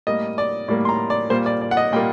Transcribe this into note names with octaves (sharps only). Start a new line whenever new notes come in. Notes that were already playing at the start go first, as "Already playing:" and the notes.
A2 G3 A#3 D#5
D5
A2 G3 A#3 D5
C6
A#5
D5
A#2 G3 A#3 C5
D5
D5
F#5
D#5
A#2 G3 A#3 G5